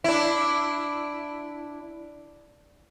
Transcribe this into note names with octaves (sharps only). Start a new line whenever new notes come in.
D4 E4